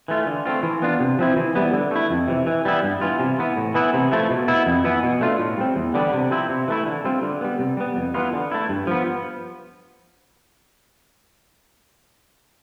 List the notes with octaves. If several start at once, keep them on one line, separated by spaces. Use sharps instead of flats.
E3 A3 D4 F4
D3
A3 C4 F4
E3
B3 D4 F4
C3
F3 C4 E4
E3
G3 B3 E4
D3
A3 E4
F2
C3 E3
E3
G3 B3 E4
G2
E3 B3 F4
C3
E3 B3
A2
E3 B3 E4
C3
F3 A3 E4
B2
B3 E4
F2
E3 B3 E4
B2
A3 D4 F4
A2
G3 C4
E2
D3 G3 B3 D4
C3
F3 C4 E4
C3
E3 A3 E4
D3
G3 C4 F4
D3
G3 B3
C3
G3 B3
F2
E3 B3 F4
D3
A3 E4
G2
F3 B3